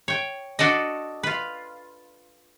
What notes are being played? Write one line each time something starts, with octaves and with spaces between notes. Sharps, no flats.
C#5 G5
D4 F#4 A4 D5 D#5
F4 B4